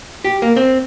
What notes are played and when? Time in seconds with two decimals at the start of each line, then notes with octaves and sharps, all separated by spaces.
0.24 G4
0.42 A#3
0.56 C4